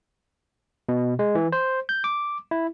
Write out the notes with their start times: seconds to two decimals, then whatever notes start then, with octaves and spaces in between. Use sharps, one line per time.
0.89 B2
1.19 G#3
1.35 E3
1.53 C5
1.89 G6
2.04 D6
2.51 E4